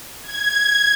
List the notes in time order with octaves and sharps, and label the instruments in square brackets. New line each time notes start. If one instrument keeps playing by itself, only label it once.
[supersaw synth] G#6